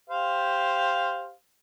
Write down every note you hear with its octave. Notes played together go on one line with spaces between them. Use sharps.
G4 C5 F5